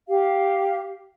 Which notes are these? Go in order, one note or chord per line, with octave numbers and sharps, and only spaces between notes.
G4 F5